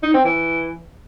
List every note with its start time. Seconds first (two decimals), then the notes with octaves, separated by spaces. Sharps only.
0.03 D#4
0.14 C4
0.25 E3